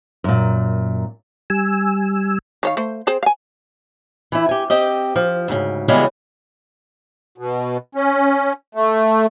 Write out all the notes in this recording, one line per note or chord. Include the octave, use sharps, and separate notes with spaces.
F#2 A#2
G3 G#5 E6
D#3 C#5 F5
A3 C5
C4 G#4 C5
F5 G#5
E3 E4
G4 G#5
C4 G4 D#5
F3
D2 G#2 C#3
F#2 C#3 E3 G3 G#3 B3
B2
C#4
A3